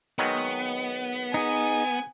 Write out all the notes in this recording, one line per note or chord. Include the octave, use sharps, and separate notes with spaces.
D#3 F#3 G#3 B3
D#4 G#4 G#5